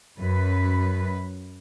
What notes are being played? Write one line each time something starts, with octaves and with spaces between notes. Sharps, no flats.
F#2 B4